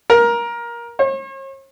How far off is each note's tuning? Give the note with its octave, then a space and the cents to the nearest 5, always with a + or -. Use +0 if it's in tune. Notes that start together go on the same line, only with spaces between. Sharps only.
A#4 +20
C#5 -45